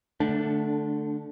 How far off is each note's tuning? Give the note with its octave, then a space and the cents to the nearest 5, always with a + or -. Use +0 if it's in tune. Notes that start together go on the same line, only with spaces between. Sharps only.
D3 +10 A3 +0 D4 -20